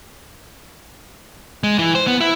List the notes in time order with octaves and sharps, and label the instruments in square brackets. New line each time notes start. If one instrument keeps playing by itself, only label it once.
[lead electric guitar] G#3
E3
C5
B3
E4